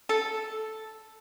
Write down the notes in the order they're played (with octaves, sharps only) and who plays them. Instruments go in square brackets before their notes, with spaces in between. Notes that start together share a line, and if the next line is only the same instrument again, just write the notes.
[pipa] A4